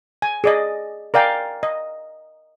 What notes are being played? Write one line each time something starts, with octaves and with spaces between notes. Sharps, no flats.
G#5
G#4 D5 D#5
A#4 D5 F5 G5 G#5
D#5